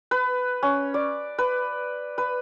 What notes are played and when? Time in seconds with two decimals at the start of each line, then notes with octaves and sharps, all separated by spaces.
0.11 B4
0.63 C#4
0.94 D5
1.38 B4
2.18 B4